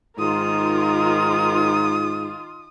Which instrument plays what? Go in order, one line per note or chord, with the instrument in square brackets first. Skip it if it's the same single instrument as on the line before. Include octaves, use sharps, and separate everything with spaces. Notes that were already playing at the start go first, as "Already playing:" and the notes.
[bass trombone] G#2 [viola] D#3 A#4 [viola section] F4 [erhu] D#6